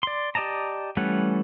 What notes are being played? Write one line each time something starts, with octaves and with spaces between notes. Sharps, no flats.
D5 C6
G4 D5 D#5 A5 A#5
E3 G3 A3 C#4 F#5